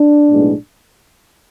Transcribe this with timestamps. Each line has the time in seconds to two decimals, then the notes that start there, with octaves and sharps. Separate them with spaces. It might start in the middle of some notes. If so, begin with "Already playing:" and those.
Already playing: D4
0.30 B1 A2 G#3 B3